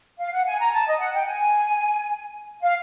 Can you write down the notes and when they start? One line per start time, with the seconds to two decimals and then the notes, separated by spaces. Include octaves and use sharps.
0.20 F5
0.33 F#5
0.47 G#5
0.60 A#5
0.73 A5
0.87 D#5
1.00 F#5
1.14 G5
1.27 G#5
2.62 F5